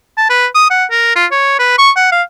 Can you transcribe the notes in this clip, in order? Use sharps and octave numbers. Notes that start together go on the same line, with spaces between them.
A5
B4
D#6
F#5
A#4
F4
C#5
B4
C#6
F#5
F5